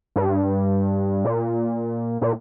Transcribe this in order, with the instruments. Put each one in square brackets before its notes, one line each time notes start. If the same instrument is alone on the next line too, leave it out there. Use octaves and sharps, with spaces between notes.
[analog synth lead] G2
A#2
A#2